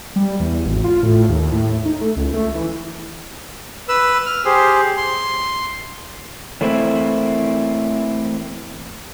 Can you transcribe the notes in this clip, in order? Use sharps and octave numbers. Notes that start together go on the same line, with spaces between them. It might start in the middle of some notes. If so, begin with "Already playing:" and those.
G3
E2
G#1
F4
A2
D#2
A2
D#4
A3
C#2
A3
E3
B4 E6
F6
G4 G#4 C5
C6
E3 A3 A#3 C4 E4